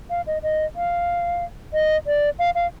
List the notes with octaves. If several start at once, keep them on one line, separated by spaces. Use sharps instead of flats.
F5
D#5
D#5
F5
D#5
D5
F5
F5